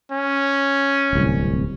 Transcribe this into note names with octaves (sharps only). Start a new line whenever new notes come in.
C#4
D1 C2